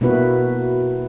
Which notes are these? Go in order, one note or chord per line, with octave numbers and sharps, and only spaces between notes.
B2 A#3 D4 E4 F#4 B4